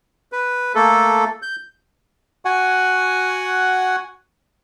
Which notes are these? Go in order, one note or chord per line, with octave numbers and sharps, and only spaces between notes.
B4
A3 A#3 A4
G6
F#4 F#5 G#5